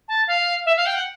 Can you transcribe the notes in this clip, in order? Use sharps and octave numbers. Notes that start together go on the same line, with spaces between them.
A5
F5
E5
F5
G5
F#5